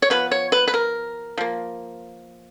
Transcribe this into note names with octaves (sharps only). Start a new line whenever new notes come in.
C#5
F3 B3 B4
C#5
B4
B4
A#4
F3 A#3